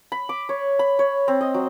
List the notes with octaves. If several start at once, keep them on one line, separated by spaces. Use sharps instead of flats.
B5
D6
C#5
B5
C#5
C4
D#5
F#3